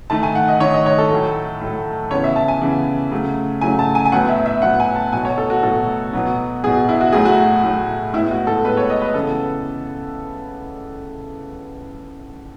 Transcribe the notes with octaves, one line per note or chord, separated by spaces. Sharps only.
D#3 A3 A5
G#5
F#5
D#5
D#3 A3 C#5
D#5
C#5
A4
A2 F#3 A3
A2 F#3 A3
C#3 E3 B3 C#5
E5
A5
G#5
C#3 E3 B3
C#3 F#3 A3
C#3 F#3 A3 G#5
A5
G#5
G#5
A2 F#3 B3 F#5
E5
E5
A2 F#3 B3 F#5
G#5
A5
B2 F#3 A3 G#5
C#5
A4
F#4
B2 F#3 A3 A4
B2 F#3 B3
B2 F#3 B3 G#4
E4
F#4
A2 F#3 A3 G#4
F#4
A2 F#3 A3
A2 G#3 B3 E4
F#4
A4
A2 G#3 B3 B4
C#5
D#5
B4
C#3 E3 B3 A4